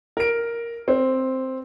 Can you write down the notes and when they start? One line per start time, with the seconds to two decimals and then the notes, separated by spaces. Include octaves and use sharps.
0.17 A#4 D7
0.88 C4